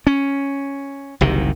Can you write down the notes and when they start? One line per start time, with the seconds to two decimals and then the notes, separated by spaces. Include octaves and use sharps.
0.07 C#4
1.21 F#1 C2 C3 D#3